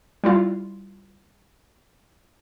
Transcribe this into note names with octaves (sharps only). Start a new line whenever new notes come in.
G3 E4 F4